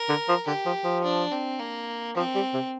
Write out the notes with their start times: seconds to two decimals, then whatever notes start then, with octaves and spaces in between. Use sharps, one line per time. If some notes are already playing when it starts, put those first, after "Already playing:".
Already playing: A#4
0.09 D3
0.29 F3
0.47 D3 G4
0.66 F3
0.84 F3
1.04 D4
1.31 C4
1.59 A#3
2.16 F3 C4
2.35 G3
2.54 C3